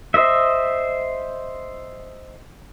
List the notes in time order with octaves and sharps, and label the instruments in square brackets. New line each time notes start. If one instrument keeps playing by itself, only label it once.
[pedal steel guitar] C5 D#5 E5